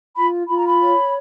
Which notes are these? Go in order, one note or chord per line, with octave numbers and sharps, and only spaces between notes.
F4 B5
F4 B5
A#5
B5
C#5